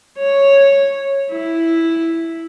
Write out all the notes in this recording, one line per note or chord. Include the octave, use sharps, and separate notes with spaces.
C#5
E4